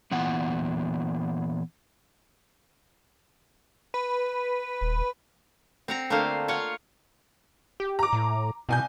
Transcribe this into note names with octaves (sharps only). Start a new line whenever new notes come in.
A#2 E3 B3 F#5
B4
D#1
C4 F#5 A#5
D3 A3 A#3 F4 C5 F5
F4 C#5 F5 F#5
G4
A#5 D6
A2
C2 B2 G#5 G6